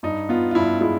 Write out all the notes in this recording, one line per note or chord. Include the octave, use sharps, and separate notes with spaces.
G2 D#4
B3 F4
F4
G2 E4
G#3 E4